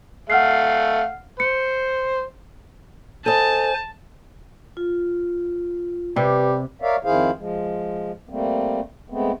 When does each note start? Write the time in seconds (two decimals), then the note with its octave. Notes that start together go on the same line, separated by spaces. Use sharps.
0.30 A3 F5 F#5 F6 C7
1.40 C5 C#7
3.26 A4 C5 D#5 G#5 A5
4.77 F4
6.16 C3 G3 B4
6.82 A#4 C#5 D5 E5 F5
7.05 F2 D#3 E4 G#4 C5 F5
7.38 F3 G#3
8.29 G3 A3 A#3 C4
9.10 G#3 A3 B3 C4